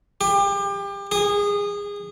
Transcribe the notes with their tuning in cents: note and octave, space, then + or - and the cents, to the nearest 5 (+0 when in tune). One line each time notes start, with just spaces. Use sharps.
G4 +30
G#4 -25